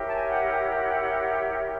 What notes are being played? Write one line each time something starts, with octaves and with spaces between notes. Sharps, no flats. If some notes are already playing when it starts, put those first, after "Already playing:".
Already playing: E4 G4 A#4 C#5
A5
G#5
F#5